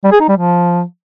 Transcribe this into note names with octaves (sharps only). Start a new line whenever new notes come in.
G3
G#4
D#4
G3
F3